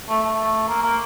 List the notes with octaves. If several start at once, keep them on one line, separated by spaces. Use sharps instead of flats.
A3
A3
A#3
A#3